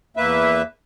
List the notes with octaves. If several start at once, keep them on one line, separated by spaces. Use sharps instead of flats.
E2 A#3 B4 E5